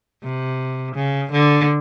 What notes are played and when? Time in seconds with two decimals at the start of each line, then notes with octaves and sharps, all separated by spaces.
0.23 C3
0.95 C#3
1.32 D3